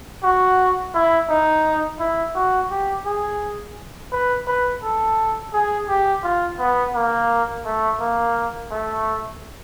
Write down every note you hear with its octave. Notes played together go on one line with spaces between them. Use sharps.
F#4
E4
D#4
E4
F#4
G4
G#4
B4
B4
A4
G#4
G4
F4
B3
A#3
A3
A#3
A3